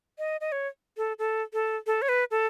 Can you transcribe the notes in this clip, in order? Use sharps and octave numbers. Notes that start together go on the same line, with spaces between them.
D#5
D#5
C#5
A4
A4
A4
A4
C#5
B4
A4